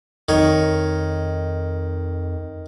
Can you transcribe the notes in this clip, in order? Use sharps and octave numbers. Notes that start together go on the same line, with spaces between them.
F2 D#3 C#5